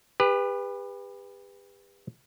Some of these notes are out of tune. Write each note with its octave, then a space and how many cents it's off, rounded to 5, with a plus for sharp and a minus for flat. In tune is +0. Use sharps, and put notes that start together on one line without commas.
G4 +40 B4 +0